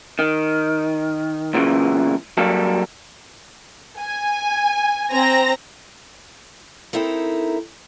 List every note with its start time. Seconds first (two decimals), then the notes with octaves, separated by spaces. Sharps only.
0.19 D#3
1.54 B1 A#2 C#3 E3
2.37 F#3 G3 A#3 A4
3.99 G#5
5.11 C4 A#5 A#6
6.93 C4 D#4 E4 A4 A#4